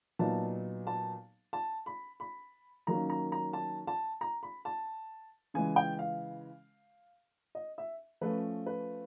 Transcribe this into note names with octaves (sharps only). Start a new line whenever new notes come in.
A#2 F#3 B3 D#4 A5
A5
A5
B5
B5
D#3 F#3 A#3 C#4 A#5
A#5
A#5
A5
A5
A#5
B5
A5
C#3 E3 G#3 G#5
G5
F5
D#5
E5
F3 A3 C#4 B4
B4